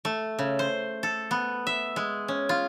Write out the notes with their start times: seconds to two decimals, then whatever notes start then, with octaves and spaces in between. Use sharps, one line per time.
0.05 A3
0.39 C#3
0.59 C5
1.03 A4
1.31 B3
1.67 E5
1.96 G#3
2.28 C#4
2.49 F4